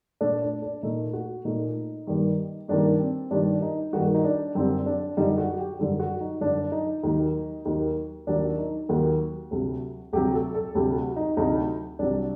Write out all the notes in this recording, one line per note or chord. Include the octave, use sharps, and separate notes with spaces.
A#2 A3 D4
D4
D4
A#2 A3 D#4
F#4
A#2 A3 D#4
G2 D#3 G3 A#3
G2 D#3 G3 A#3 D4
C4
G2 D#3 G3 A#3 D4
D#4
G2 D#3 G3 A#3 F#4
F#4
D#4
D4
F#2 D3 G3 C4
D4
F#2 D3 G3 D#4
F#4
G4
F#2 D3 G3 A4
F#4
D#4
F#2 D3 G3 D4
D#4
D#2 D#3 F#3 A#3 D#4
D#2 D#3 F#3 A#3 D#4
D#2 D#3 F#3 A#3 D4
D#4
D#2 D#3 F#3 A#3 F#4
D2 C3 F#3
D2 C3 F#3 G4
A4
A4
D2 C3 F#3 G4
F#4
D#4
D2 C3 F#3 D#4
C2 C3 F#3 D4